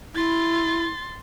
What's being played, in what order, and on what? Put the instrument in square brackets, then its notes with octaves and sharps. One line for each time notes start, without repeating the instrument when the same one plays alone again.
[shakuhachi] E4 [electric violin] C6 A6